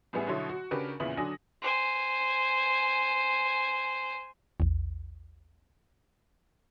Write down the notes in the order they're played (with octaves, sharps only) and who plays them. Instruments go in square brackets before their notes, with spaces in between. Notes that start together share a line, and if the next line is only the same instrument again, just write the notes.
[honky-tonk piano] A1 G3 B3 G#4 E5
B2 D3 F#3 E4 C#5 C6
F#4
C#3 D4 F#4 G4 A#4 B4
E2 A#2 C#3 B3 E4 F#7
D3 F#3 D4 G#5 D#6 A#6
[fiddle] C5 G#5
[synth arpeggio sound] A#1 E2